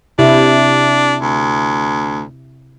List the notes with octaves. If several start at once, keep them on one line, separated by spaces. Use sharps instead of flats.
C3 D4 E4
D2